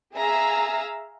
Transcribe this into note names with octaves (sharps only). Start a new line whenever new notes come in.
G#4 E5 F5 A#5 E6